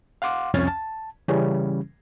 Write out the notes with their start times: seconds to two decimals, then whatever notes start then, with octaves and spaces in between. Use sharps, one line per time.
0.22 F5 F#5 C6 D6
0.54 C2 F2 C#4 G#5 F6 A6
0.67 A5
1.28 C#3 E3 G3 C#4